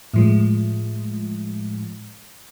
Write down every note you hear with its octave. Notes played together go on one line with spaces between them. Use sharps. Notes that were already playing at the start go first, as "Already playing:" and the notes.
A2 F3 G#3